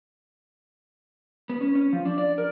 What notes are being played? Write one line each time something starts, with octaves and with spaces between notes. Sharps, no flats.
B3
C#4
C#4
F3
D4
D5
A#4